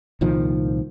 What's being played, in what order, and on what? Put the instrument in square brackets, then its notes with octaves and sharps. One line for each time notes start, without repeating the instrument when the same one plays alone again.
[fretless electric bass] C2 A#2 D#3 F3